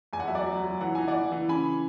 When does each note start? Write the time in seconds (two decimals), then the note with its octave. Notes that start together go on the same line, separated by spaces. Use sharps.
0.13 E2 G#5
0.20 F#5
0.28 F#3 E5
0.35 D5 F#5
0.47 F#3
0.64 F#3
0.81 E3 F#5
0.95 E3 G#5
1.08 D5 F#5
1.15 E3
1.32 E3
1.49 C#3 G#5 B5